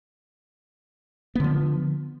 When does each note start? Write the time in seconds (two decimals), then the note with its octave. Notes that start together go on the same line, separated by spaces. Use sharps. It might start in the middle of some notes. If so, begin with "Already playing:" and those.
1.35 B3
1.40 D3
1.44 F3